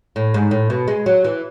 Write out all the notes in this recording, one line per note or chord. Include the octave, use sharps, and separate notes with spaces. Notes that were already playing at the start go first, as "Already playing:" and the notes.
A2
G#2
A2
B2
G#3
F#3
E3